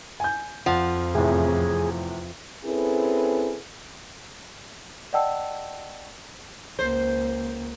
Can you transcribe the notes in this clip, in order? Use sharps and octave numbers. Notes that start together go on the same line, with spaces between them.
G#5 G6
F2 F3 F#5
E2 A2 C3 G#4
C4 C#4 E4 G#4 A4 B4
D5 D#5 F#5 G5 A5 E6
C#2 A#3 C5